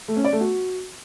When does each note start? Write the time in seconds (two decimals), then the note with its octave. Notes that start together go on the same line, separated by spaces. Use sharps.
0.08 A3
0.16 C#4
0.24 D5
0.33 A3
0.41 F#4